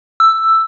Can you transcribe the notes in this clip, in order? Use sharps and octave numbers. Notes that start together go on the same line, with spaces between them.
E6